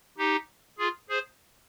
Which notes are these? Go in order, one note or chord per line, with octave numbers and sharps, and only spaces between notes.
D#4 G4
F4 G#4
G#4 C5